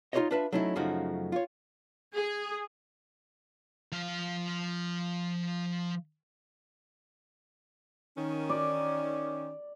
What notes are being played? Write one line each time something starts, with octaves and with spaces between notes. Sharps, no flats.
D#4 F4 F#4 C5 C#5 D#5
D4 F4 B4 E5 A5
F#3 A3 C#4 D#4 E4
F#2 C#3 F3 A3 D#4 F#4
F4 C#5
G#4
F3 F5
D#3 C#4
D5